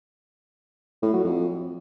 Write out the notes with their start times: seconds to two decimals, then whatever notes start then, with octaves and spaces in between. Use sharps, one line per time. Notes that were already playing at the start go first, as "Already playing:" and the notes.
1.03 A2
1.13 F#3
1.24 F2